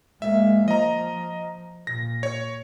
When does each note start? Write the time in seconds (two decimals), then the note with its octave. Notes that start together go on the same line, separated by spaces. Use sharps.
0.22 G#3 A#3 E5
0.68 F3 D#5 A#5
1.87 A#2 A#6
2.23 C#5